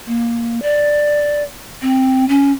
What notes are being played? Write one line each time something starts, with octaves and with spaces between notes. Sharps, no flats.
A#3
D5
C4
C#4